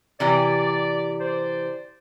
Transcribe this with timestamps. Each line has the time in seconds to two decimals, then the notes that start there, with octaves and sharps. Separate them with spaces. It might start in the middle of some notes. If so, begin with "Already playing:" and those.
0.20 C3 E3 G4 D5
1.20 C5 D5